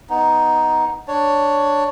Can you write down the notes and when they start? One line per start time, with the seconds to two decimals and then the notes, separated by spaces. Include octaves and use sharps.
0.10 B3 D#4
1.08 D4 C#5